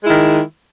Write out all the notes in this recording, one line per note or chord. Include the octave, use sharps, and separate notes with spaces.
D#3 G#3 E4